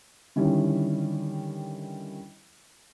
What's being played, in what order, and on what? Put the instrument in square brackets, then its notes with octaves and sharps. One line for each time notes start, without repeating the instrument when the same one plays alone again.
[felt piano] D3 D#3 G3 C#4 E4